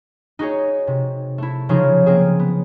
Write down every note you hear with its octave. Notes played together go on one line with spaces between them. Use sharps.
D#4 F#4 G#4 C#5
C3
A3 E4
C#3 F3 F#3 D#4 F4 G#4
A#3 C4 G#4
B3